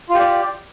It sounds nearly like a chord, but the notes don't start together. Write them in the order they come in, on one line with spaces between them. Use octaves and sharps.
F4 G4 D5